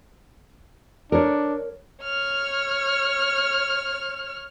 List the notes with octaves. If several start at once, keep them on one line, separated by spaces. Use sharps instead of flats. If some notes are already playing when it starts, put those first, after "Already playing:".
D4 A#4 C#5
C#5 F6